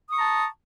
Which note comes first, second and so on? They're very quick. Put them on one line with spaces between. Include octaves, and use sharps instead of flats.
D#6 C#6 A#5 A5